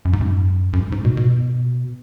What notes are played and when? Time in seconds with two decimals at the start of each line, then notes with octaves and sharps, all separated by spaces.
0.05 F#2
0.13 G#2
0.21 F#2
0.73 F#2
0.79 G#2
0.92 G#2
1.01 A2
1.05 B2
1.17 B2